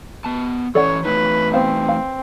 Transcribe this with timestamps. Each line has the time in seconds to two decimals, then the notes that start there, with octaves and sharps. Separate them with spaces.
0.25 B3 A5
0.75 E3 C#4 A4 C#5 D5 F#5
1.05 E3 A3 D#4 B4
1.54 B3 C4 C5 F5
1.89 F5